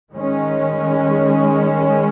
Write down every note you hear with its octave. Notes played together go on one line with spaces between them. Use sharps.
D#3 G#3 C#4